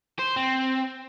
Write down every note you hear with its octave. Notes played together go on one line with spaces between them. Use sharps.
C5
C4